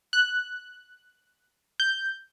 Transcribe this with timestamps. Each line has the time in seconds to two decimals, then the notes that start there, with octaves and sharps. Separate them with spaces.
0.13 F#6
1.80 G6